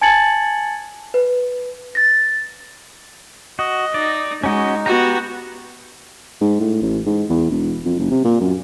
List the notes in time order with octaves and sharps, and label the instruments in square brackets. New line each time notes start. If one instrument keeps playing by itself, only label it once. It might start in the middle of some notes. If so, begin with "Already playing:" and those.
[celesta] G#5 A5 G#6 A6 C#7 F#7
B4
A6 A#6
[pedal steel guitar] F#4 [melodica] D#5
[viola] D#4 [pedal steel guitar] D5
[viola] G#3 [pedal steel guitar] C#4 F#4 D#5 [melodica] D#4
[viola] B3 F#4 [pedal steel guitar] G4 A#5
[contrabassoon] G#2
A2
A1
G#2
E2
E1
F2
F#1
C3
A#2
F#2